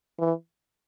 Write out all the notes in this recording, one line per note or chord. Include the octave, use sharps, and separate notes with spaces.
E3